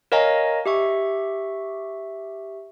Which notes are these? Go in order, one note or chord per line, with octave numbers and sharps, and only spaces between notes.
A#4 C#5 D#5 F5 G#5 A#5
G4 E5 C#6